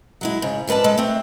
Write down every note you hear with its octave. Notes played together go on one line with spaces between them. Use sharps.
F#3 G#3 E4
G#2 C#3
F2 G#2 B4 D5 A5
G#3 A4
A3 C4